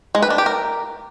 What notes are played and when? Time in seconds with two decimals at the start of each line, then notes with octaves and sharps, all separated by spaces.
0.15 G#3
0.22 B4
0.30 D4
0.38 G4
0.46 A#4